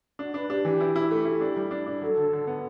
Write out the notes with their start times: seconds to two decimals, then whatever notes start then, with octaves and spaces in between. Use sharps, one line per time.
0.19 D4 F#4
0.34 D4 B4
0.50 D4 G4
0.65 E3 G4
0.80 E4
0.96 E4
1.11 A3
1.25 E4
1.41 D4
1.56 G3
1.71 D4
1.87 D4
2.02 F#3 A4
2.17 D3
2.33 D3
2.47 B3